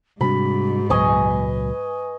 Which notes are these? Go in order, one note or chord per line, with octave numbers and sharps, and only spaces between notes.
G#2 C3 G3 D4 F#4 B5
C#2 A#2 F#3 B4 D#5 G#5 C#6